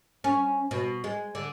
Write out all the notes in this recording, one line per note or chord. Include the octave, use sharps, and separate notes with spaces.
C#4
B2
G#3
D3